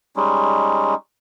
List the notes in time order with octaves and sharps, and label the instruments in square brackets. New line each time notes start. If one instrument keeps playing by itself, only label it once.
[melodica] G3 G#3 C#4 D#4